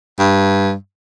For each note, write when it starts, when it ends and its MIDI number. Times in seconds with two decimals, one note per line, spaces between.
0.19 0.74 43